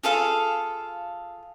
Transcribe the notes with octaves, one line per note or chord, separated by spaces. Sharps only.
F4 G#4 A4 F5